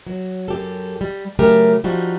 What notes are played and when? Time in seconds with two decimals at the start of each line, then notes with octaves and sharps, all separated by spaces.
0.07 F#3
0.48 F#2 G4 A4
1.01 G3
1.39 C#3 F#3 A3 G4 A#4
1.84 F3 G3 D#4 F#4